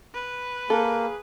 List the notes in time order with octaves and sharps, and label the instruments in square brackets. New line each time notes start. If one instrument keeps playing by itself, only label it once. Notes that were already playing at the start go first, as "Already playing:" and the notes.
[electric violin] B4
[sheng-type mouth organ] A#3 [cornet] G#4 [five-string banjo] A4